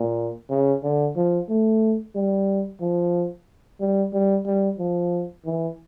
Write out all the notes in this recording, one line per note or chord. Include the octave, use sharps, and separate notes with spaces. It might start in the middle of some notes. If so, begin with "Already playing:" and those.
Already playing: A#2
C#3
D3
F3
A3
G3
F3
G3
G3
G3
F3
E3